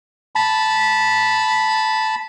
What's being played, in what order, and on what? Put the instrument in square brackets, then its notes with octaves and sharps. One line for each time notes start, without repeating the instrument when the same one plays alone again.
[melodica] A5 B5